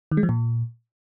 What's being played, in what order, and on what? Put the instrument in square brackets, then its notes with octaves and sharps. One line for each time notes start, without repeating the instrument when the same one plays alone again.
[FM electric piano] D#3
G#3
F3
A#2